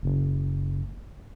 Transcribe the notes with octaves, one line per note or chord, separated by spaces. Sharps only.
F#1